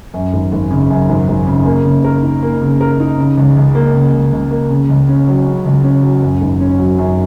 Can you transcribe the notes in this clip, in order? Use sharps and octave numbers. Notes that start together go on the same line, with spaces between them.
F#2
G#1
G#1
C#3
F#2
G#1
G#1
C#3
A#3
C#3
A#4
D#4
A#3
C#3
A#4
D#4
C#3
C#2
C#2
A#3
C#3
C#2
C#2
A#3
C#3
C#2
C#4
F#3
C#3
C#2
C#4
F#3
F#2
G#1
C#4
F#3
F#2